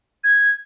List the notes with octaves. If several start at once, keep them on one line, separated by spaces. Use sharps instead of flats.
G#6